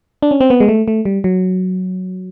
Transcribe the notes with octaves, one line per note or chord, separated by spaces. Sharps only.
D4
C#4
C4
B3
G#3
A3
A3
G3
F#3